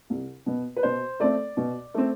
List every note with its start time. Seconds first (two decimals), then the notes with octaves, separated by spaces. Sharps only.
0.10 C2
0.46 B2 B3
0.76 B4
0.83 B2 C5
1.20 A3 C4 D5
1.57 B2
1.94 A3 C4